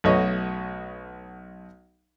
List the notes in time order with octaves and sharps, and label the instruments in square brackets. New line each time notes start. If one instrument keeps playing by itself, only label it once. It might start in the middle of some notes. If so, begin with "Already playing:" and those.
[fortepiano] B1 A3 F#4 B4 C#5 D#5